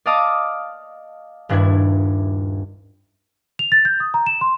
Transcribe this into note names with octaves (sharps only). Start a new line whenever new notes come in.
D5 D#5 F5 A5 D6 D#6
D#1 G2 D4 E4 G#6
F7
A6
G6
D#6
A#5
E7
C6